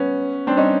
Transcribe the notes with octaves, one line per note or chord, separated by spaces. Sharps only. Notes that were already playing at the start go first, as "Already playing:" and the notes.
Already playing: B3 C#4
C4 D4
C#4 D#4